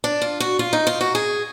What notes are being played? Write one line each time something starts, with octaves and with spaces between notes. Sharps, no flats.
D4
F4
F#4
F4
D#4
F4
F#4
G#4